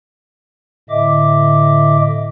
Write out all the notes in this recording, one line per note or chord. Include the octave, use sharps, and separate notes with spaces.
A2 D3 D#5 E5 D6